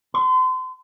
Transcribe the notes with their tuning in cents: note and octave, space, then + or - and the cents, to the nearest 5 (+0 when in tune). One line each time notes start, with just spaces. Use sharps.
C6 -35